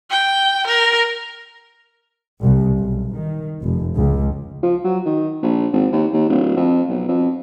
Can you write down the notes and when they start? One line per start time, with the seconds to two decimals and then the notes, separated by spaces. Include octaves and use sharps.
0.11 G5
0.67 A#4
2.42 C2
2.78 B1
3.15 D#3
3.62 F1
3.94 C#2
4.63 F3
4.84 F#3
5.05 D#3
5.42 A#1
5.73 G#1
5.92 D#2
6.13 D#2
6.29 D1
6.56 F2
6.88 B1
7.08 F2